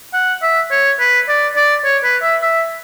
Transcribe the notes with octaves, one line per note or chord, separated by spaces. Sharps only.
F#5
E5
C#5
B4
D5
D5
C#5
B4
E5
E5